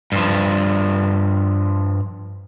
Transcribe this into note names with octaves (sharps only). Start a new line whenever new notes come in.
G2 F3